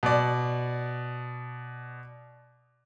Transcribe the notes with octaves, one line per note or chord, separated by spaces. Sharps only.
B2 D5